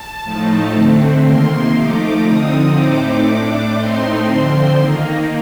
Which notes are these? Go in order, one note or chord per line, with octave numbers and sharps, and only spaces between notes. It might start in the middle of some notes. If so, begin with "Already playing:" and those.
Already playing: A5
A2 F3 A3 D#4
D3 A3 C4
C3 D#3 A#3 C6
F3 A3 D#4 D6
D3 F3 C4 D#4 D#6
A2 A3 C4 D#4 D6
A2 A3 D4 D6
A2 A3 C4 D#4 C6
D3 F3 C4
D#3 A#3 D#4